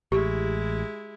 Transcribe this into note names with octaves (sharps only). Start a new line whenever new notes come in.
A1 G#3 E4 G4